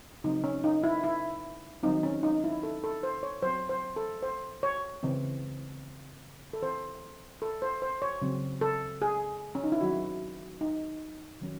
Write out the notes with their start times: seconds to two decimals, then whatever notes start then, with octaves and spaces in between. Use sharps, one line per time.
0.24 C#3 F#3 C4 D#4
0.44 C#4
0.64 D#4
0.83 E4
1.04 E4
1.83 D#3 F#3 C4 D#4
2.03 C#4
2.23 D#4
2.44 E4
2.63 A4
2.84 A4
3.03 C5
3.23 C#5
3.42 F#3 C4 C5
3.69 C5
3.96 A4
4.22 C5
4.63 C#5
5.03 C#3 E3 C4
6.53 A4
6.62 E3 C4 C5
7.42 A4
7.62 C5
7.82 C5
8.02 C#5
8.22 C#3 F#3 C4
8.61 A4
9.02 G#4
9.55 C#4
9.64 D#4
9.72 E4
9.81 D#3 F#3 C4 F#4
10.61 D#4
11.41 D#3 F#3 C#4